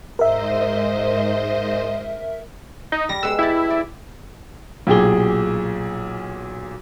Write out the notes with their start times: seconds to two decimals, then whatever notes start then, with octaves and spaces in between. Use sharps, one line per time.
0.19 G#2 A#4 C5 D#5 E5
2.92 D#4
3.09 G3 A#6
3.23 G#3 B3 B4 E6
3.39 E4 G4 A5
3.70 D5
4.87 B1 A#2 G4 G#4 G7